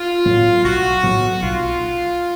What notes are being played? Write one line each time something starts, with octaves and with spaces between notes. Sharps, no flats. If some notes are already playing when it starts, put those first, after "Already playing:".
Already playing: F4
A2 F#3 B3
B1 F#4
A2 F#3 B3
B1 F4